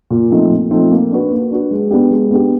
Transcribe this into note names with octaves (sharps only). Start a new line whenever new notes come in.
A#2
F3 A3 C4 D#4
A#2
F3 A3 C4 D#4
A#3
D4 F#4 B4
A#3
D4 F#4 B4
G#3
B3 D4 G4
G#3
B3 D4 G4